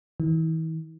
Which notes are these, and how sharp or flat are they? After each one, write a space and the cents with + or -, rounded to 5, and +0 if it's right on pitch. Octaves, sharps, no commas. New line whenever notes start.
E3 -40